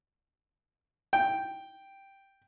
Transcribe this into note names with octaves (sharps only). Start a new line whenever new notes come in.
G5